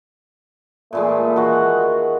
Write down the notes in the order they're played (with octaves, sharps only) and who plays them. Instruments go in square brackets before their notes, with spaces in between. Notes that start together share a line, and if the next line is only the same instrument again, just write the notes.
[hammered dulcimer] A#2 E3 G#3 [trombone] A3
[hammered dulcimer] D#3 G#3 [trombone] F#4